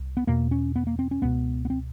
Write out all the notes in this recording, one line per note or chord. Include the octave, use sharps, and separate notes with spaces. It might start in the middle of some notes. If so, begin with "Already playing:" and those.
Already playing: C2
B3
E2 B2 A#3
C#4
B3
A#3
C4
C#4
C#2 B2 B3
B3
C4